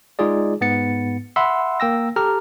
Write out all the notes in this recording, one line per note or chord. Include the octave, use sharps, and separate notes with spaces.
G#3 D#4 F4 G#4 D5
G#2 B3 A6 C#7
E5 F#5 B5 C6 E6
A#3 G5 E6 A#6
G4 A4 A#5 F6